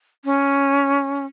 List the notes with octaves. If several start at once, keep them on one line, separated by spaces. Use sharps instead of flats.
C#4